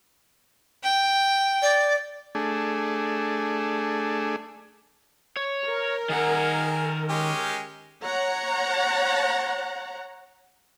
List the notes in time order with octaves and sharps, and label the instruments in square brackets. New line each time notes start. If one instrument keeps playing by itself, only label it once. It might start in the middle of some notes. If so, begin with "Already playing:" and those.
[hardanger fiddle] G5
[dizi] D5
[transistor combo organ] A3 D4 G#4
[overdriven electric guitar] C#5
[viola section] A#4
[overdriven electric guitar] D#3 F#5 [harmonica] G#4
[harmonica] G#3 C#4 G4
[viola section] C#5 F#5 A#5